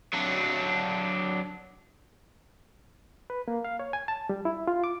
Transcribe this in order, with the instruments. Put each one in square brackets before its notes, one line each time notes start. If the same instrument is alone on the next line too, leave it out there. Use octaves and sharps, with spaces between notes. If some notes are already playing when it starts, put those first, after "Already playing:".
[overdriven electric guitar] F#3 D4
[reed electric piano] B4
A#3
F5
C#5
G#5
A5
G3
E4
F4
D6